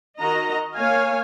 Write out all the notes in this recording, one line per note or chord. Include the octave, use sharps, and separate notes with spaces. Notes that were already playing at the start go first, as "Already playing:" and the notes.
D#3 F#4 D#5 A#5
A#3 C#5 F5 G#5